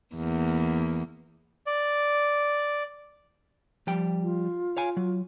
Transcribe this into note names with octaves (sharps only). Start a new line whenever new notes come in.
E2 A#3
D5
F3 G3 G5
F4
C#5 F5 G#5
F#3